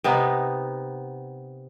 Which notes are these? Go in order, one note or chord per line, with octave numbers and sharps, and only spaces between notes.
C3 B3 D#4